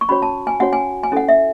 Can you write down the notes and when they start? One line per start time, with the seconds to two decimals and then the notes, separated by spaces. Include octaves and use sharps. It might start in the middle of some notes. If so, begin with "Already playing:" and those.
0.01 C#6
0.09 C#4 F#4 C#5 B5
0.22 A5
0.47 G#5
0.60 C#4 F#4 C#5 F#5
0.73 G#5
1.03 G#5
1.12 C#4 E4 A4 F#5
1.28 E5